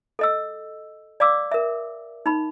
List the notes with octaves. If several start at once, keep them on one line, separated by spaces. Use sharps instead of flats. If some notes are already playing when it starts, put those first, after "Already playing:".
A4 D#5 E6
D5 F5 D6 E6
A#4 E5
D#4 B5